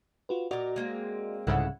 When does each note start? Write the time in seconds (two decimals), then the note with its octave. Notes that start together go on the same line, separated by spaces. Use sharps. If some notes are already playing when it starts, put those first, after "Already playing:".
0.29 F4 F#4 B4
0.51 A#2 F#4 A#4 D5 D#5
0.76 G#3 A#3 C4
1.47 C2 G#2 C#3 E4 A4 F#5